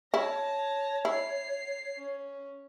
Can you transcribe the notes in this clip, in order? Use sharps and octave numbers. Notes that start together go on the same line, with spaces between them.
E4 C#5 A5 A#6
E4 C7
C#4